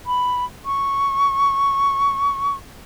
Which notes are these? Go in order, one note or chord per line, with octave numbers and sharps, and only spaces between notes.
B5
C#6